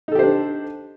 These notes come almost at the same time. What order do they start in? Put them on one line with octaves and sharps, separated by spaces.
D#4 A4 G4 C5 D4